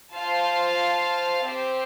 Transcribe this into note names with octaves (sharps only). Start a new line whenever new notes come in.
F4 C5 F5 A5
C4 G4 C5